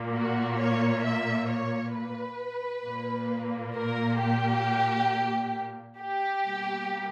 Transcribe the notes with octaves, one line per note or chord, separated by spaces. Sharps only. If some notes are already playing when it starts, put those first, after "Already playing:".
Already playing: A#2 A#3
F#4
C#5
E5
C#5
B4
A#2 A#3
A#4
G4
G4
B2 G3 A#3